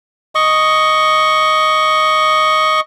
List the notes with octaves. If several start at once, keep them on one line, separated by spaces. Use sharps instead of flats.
D#5 C#6